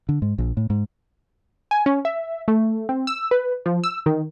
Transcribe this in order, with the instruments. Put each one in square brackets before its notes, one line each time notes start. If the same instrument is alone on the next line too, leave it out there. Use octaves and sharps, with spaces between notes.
[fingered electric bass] D3
G#2
A#1
A2
G#2
[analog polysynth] G#5
C#4
E5
A3
C4
E6
B4
F3
E6
D#3